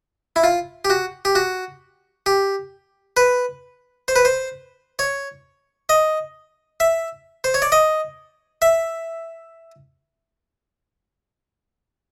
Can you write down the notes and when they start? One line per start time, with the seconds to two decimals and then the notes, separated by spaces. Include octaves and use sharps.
0.36 E4
0.44 F4
0.85 G4
0.90 F#4
1.25 G4
1.35 F#4
2.26 G4
3.17 B4
4.08 C5
4.16 B4
4.25 C5
4.99 C#5
5.89 D#5
6.80 E5
7.44 C5
7.54 C#5
7.62 D5
7.72 D#5
8.62 E5